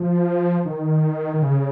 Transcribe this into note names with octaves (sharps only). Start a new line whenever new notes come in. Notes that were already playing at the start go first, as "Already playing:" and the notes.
Already playing: F3
D#3
D#3
C#3